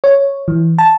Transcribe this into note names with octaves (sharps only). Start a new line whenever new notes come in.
C#5
E3
A5